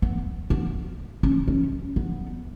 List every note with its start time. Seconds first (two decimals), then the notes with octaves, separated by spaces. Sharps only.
0.02 B3
0.50 B3
1.23 C#4
1.48 C#4
1.96 B3